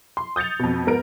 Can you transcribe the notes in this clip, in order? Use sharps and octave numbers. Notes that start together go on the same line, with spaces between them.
C6
D#6 G6 A6 C#7 F7
F2 B2
G#2 B3 A#4 D7